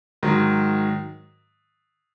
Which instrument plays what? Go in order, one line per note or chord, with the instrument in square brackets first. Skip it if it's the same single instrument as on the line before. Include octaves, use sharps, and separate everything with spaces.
[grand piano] G#2 D#3 F#3